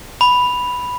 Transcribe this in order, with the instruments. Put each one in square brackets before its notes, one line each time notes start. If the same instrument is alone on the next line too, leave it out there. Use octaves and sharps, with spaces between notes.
[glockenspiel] B5